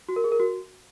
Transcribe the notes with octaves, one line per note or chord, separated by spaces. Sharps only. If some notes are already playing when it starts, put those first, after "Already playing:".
F#4
A#4
G#4
A#4
F#4